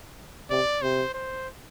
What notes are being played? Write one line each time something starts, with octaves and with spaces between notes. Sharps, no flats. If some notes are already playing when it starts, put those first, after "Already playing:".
C3 D5
C3 C5
C5